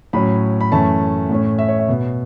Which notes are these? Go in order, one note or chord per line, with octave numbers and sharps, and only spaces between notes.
A2 F#3 C#4 B5
B5
F#2 E3 A3 C#4 A5
A2 A3 C#4
E5
C#5
E5
B2 B3